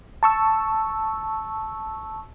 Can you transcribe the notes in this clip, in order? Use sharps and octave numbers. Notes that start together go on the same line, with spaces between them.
A5 C#6 E6